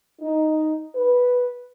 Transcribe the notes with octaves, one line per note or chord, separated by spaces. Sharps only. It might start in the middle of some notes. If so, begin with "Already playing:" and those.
D#4
B4